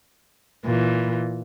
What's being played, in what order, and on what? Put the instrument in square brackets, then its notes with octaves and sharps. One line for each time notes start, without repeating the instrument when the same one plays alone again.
[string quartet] A#2 E3